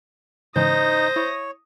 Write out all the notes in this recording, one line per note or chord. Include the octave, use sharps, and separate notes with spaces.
G#2 C#3 E3 D#4 C5 D#6 A#6
E4 C#5